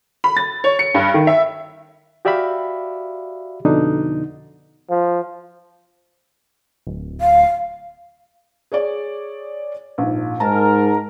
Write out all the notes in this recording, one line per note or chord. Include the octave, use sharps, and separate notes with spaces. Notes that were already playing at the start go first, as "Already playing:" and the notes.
B5
A6
C#5
C#7
G2
D#3
E5
F#4 G4 D5 E5 F5 B5
F2 B2 D3 D4 D#4
F3
D1
F5
G#4 C#5 D5
A#1 G#2
G#2 A#4 A5 A#5